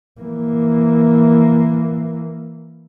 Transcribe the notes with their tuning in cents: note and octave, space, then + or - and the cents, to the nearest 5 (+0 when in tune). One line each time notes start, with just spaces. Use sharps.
E3 +0 A#3 +0